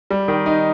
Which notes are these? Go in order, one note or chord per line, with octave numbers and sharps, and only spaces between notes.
G3
D#3
D#4